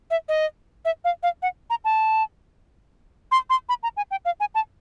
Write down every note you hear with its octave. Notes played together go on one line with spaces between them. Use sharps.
E5
D#5
E5
F5
F5
F#5
A#5
A5
C6
C6
B5
A#5
G#5
G5
F5
G#5
A5